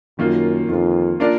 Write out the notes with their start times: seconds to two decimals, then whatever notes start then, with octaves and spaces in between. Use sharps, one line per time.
0.19 F#2 D#3 A#3 F4
0.69 F2 D#3 A#3 F4
1.20 A#3 D4 F4 A#4 D5